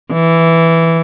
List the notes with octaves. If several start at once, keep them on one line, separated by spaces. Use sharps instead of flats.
E3